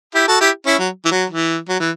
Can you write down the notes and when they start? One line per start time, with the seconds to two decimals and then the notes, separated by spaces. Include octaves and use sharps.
0.15 E4 G4
0.28 F#4 A4
0.41 E4 G4
0.66 C#4 E4
0.79 F#3
1.05 E3
1.11 F#3
1.30 E3
1.69 F#3
1.80 E3